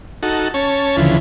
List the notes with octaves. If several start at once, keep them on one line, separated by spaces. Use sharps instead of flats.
D#4 F#4 A4
C#4 C#5 A5
D2 C#3 E3 F3